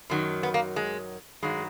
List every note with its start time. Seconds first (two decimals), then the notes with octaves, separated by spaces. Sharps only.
0.10 F#2 D#3 F#3
0.43 B3
0.54 A#3
0.76 G#3
1.42 G2 D#3 F#3 G#3